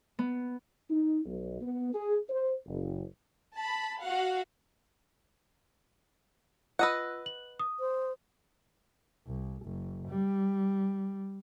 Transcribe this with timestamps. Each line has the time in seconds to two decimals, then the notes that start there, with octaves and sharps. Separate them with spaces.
0.19 B3
0.90 D#4
1.26 B1
1.61 B3
1.94 G#4
2.30 C5
2.66 F#1
3.58 A5 B5
4.05 F#4 F5 F#5
6.79 F4 B4 D#5 F#5 E6
7.26 F#7
7.60 D#6
7.80 C5
9.26 C2
9.64 F#1
10.09 G3